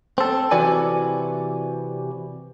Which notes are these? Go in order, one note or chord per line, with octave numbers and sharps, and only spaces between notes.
C4 A4
C3 E3 F#4 B4 D5 G#5